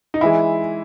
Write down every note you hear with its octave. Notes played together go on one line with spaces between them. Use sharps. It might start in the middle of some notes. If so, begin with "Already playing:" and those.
D#4
E3 G#3 E4